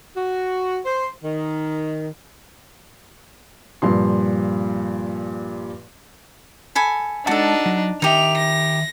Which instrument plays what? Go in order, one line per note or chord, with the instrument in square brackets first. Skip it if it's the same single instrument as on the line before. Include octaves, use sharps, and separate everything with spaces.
[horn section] F#4
C5
D#3
[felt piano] G2 A#2 F3 C6
[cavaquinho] A4 G#5 B5
[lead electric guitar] G#3 A5 [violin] D4 D#4 [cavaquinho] F#4 A4
[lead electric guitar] F#3
[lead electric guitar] D#3 E5 [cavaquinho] D#4 G4 [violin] F7
[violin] A#6